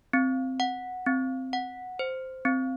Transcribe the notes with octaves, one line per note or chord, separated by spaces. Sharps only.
C4
F#5
C4
F#5
C5
C4